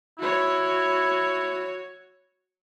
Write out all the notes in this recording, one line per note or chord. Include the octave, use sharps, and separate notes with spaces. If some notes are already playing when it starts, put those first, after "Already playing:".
E4 F#4 C#5